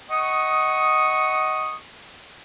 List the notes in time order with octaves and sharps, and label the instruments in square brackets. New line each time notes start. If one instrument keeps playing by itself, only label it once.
[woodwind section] D#5 F#5 C#6 D#6